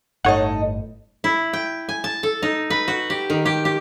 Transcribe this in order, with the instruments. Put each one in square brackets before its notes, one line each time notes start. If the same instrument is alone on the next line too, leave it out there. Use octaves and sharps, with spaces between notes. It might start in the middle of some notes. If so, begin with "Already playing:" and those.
[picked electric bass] G1 A2 [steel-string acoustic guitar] D#4 A4 D#5 [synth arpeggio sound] C#5 F#5
[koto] E4
G5
G#5
A5
A4
D#4
B4
F#4
G4
D#3
G4
G4